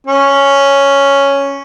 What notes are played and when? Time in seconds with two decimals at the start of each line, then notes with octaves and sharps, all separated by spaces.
0.07 C#4